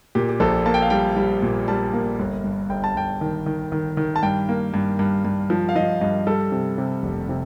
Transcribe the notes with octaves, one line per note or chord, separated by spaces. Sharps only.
A#2 G4
G4
A#1 A4
A#3 A5
G5
F5
G3 G5
G3
A#2
G3 A5
A#3
G1
G2
G1 G5
A5
G1 G5
D#3
D#3
D#3
D#3
A5
G2 G5
A#3
G2
G2
G2
F3
F5
F3 D#5
G2 D#5
G3 A4
C3
C3
F1
C3